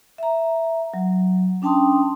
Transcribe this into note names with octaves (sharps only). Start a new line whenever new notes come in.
E5 A#5
F#3
C#4 D4 G5 A5 C6 D#6